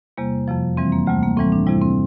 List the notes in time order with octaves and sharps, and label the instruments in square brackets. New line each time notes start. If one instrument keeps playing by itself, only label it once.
[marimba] E2 C3 G3 A#3
F2 C3 F3
E2 E3 G3 C4
A#3
D2 C3 G3 A3
A#3
A2 E3 G3 C4
D4
F2 C3 G3 E4
C4